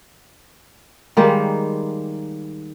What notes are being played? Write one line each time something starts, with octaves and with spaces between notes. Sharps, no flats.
D#3 G3 G#3 A#3